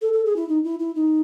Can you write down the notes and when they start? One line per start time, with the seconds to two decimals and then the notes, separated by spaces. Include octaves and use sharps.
0.02 A4
0.13 A4
0.25 G#4
0.36 E4
0.49 D#4
0.64 E4
0.79 E4
0.95 D#4